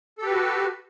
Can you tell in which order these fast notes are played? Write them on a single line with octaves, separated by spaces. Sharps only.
A4 G4 B4 F#4